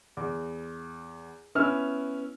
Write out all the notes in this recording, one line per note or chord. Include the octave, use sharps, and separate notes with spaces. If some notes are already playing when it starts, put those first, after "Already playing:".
E2
B3 C#4 E4 E6 F6